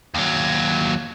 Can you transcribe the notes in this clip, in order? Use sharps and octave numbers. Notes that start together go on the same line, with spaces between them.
D#2 F#3